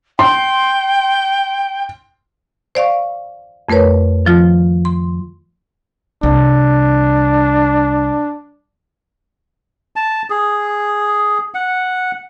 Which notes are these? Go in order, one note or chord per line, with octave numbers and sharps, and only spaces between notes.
G5 C6
C5 D5 F5 C#6
F2 A3 A#4 B4 C#5
D#3 F3 F4
C6
C2 D4
A5
G#4
F#5